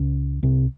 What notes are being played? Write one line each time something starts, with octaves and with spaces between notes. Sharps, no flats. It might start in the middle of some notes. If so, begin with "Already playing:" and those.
Already playing: C#2 C#3
C2 C3